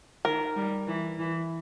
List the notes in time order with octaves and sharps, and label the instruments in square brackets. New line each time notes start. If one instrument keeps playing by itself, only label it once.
[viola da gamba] D#3 [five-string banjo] A#4
[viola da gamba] G3
E3
E3